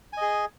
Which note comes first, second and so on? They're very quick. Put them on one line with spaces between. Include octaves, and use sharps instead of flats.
G#5 D#5 G#4